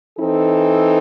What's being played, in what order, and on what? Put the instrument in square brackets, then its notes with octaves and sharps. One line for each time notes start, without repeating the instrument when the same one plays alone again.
[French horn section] E3 C4 D#4 A4